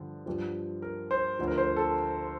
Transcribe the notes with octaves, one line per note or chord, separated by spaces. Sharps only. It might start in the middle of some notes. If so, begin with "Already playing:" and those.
Already playing: G2 D3 F3
G2 F3
A#4
C5
D2 D3 F3
A#4
C5
A4